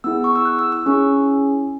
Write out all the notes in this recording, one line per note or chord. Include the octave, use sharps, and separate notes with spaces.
B3 E4 G#4 E6
C#6
E6
F#6
E6
E6
C#4 E4 G#4 C#6